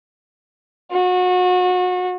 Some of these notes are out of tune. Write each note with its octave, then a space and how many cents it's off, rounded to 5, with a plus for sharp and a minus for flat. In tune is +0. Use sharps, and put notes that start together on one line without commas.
F#4 -30